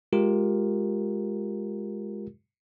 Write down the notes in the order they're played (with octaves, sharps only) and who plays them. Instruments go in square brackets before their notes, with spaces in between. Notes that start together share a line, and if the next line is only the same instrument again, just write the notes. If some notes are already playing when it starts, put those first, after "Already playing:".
[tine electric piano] G#3 F4 G4 A#4